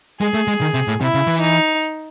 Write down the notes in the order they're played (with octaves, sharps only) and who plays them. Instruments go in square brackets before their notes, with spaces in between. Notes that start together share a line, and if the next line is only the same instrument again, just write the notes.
[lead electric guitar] G#3 [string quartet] G#4
[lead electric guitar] A3
G#3
D#3
C3
A2
[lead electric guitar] C3 [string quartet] E4
[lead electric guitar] C#3
E3
[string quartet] D#4